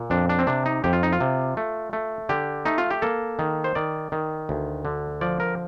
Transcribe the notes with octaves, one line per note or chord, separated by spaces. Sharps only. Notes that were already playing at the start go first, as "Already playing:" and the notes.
Already playing: A#2
F2 D4
D4
C4
C3 D4
D#4
F2 G4
F4
D#4
F4
C3
A3
A3
D3 G4
A3 D#4
F4
G4
A#3 A4
D#3
C5
D#3 D5
D#3
D2
D3
F3 D5
A#4